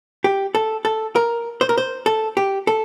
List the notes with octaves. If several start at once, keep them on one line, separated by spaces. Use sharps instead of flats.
G4
A4
A4
A#4
C5
A#4
C5
A4
G4
A4